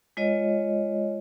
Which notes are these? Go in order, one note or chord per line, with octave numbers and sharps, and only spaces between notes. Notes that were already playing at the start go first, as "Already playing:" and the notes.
G#3 F4 C#5 D#5